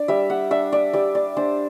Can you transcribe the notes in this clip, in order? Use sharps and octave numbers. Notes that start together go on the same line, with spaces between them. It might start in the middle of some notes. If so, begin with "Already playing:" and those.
Already playing: D4 D5
G3 E5
F#5
D4 E5
D5
G3 D5
D5
D4 C5